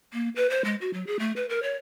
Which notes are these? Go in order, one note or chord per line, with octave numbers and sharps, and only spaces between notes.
A#3
B4
C5
G#3
F#4
F#3
G#4
A3
B4
A#4
C#5